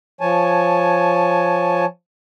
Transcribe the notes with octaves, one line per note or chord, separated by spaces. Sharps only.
F3 C#5 G#5 A5